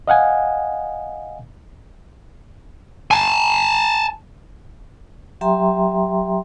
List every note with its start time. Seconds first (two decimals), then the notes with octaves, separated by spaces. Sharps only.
0.08 D#5 F5 F#5 G#5
3.11 G#5 A5
5.41 F#3 G4 E5 G5 A#5 C6